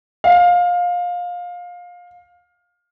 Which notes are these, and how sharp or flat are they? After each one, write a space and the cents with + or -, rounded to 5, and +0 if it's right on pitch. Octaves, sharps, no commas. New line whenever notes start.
F5 +20